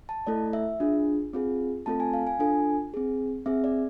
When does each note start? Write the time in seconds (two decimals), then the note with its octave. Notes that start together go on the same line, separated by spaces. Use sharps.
0.09 A5
0.27 A3 E4 A4 D5
0.53 E5
0.80 D4 F4 G#4
1.33 C4 F4 G#4
1.86 A3 C4 F4 A4 A5
2.00 G#5
2.13 F5
2.27 G#5
2.39 D4 F4 A4 G#5
2.94 C4 G#4
3.46 C4 G#4 E5
3.64 D5